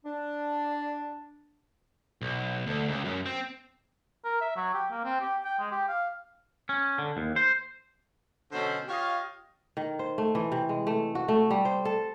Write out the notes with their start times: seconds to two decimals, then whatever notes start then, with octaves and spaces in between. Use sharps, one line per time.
0.05 D4
2.22 B1
2.67 D2
2.88 C#2
3.05 F#2
3.26 C4
4.25 A#4
4.41 E5
4.56 F#3
4.74 G4
4.91 A#3
5.04 C4
5.21 G4
5.45 G5
5.59 G#3
5.71 G4
5.88 F5
6.69 C#4
6.98 D3
7.17 D#2
7.36 C5
8.52 B2 D3 F#3 C#4 A4 C5
8.89 F4 G4 C#5 D#5 F5
9.77 D#3
9.99 C5
10.18 A3
10.35 E3
10.52 C3
10.69 G#3
10.87 A3
11.15 F#4
11.28 A3
11.50 G3
11.65 C5
11.85 A4